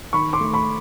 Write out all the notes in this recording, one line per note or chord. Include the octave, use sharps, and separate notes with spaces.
D#3 B5 C#6
C6 D6
A3
B5 C#6